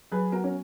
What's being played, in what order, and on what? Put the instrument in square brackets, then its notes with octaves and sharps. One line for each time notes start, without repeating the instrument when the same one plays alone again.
[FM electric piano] F#3 [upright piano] G#4 B4
[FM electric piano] B3 [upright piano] F#4 A#4
[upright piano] C#4